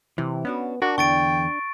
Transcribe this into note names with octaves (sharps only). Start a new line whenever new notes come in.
C3 E3
B3 C#4 D4 F#4
D4 F#4 A#4
E2 D3 E3 G5 C#6 A6 D7